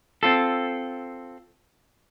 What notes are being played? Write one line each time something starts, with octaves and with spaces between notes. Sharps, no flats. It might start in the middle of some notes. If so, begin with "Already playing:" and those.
C4 F4 A4